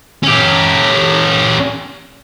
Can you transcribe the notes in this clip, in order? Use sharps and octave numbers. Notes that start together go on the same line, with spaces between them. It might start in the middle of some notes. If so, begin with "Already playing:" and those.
C#4 G4